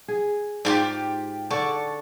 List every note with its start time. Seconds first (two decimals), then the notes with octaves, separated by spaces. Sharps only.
0.08 G#4
0.65 G#2 D4 F4 G4 G5
1.51 D3 D5 A5 C#6